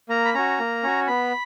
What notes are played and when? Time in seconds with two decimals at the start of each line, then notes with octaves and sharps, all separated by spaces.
0.09 A#3 A#5
0.25 B5
0.34 C#4 F#4 A#5
0.60 A#3
0.83 C#4 F#4
1.07 B3 B5